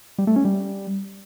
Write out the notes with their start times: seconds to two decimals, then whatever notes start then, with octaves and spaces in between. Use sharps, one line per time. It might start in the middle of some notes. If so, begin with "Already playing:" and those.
0.18 G3
0.27 A3
0.36 C#4
0.45 G3